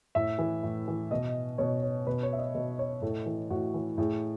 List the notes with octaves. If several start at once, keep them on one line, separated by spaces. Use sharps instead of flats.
A2 E5
E3
A2
E3
B2 D#5
B2 C#5
C#5
B2 B4
C#5
E5
D#5
B2
C#5
A2 A4
E3
A2 F#4
E3
A2 G#4